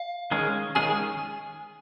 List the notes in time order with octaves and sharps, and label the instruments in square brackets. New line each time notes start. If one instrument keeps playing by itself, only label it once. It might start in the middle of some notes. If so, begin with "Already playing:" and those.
Already playing: [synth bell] F5
[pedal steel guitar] D#3 G#3 C#4 G#4
[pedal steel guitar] D#3 G#3 C#4 G#4 [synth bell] G#5